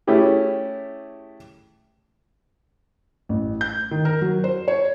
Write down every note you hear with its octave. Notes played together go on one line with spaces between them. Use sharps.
A3 C#4 E4 G4 G#4
A1
G6
D#3
A#4
F#3
C5
C#5